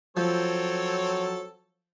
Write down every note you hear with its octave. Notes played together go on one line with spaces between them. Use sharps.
F3 F#3 C4 A4 C#5